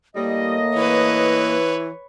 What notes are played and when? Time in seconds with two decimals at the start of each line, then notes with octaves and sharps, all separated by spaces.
0.16 A2 G3 A#3 D#5
0.76 E3 B4 C#5